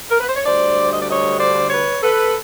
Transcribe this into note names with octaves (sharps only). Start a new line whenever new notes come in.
A#4
B4
C5
C#5
D2 D3 G3 C5 D5
D#5
D5
C#5 D#5
C5 D5
B4 C#5
A4 B4